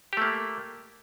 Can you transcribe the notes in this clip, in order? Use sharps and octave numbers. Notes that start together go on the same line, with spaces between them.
A3 A#3 G4